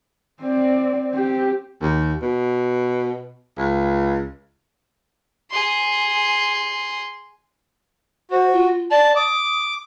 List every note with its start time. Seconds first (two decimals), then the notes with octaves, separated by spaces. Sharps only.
0.42 C4 D5
1.11 C4 G4
1.82 D#2
2.22 B2
3.58 C#2
5.51 G#4 C6
8.31 F#4 C5
8.53 F4
8.91 D5 A5
9.16 D6 D#6